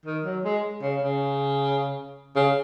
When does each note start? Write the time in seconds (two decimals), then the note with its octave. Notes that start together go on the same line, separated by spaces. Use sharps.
0.06 D#3
0.25 F#3
0.44 G#3
0.82 C#3
1.02 C#3
2.36 C#3